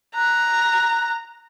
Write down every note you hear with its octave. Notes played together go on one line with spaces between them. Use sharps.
A#5 F#6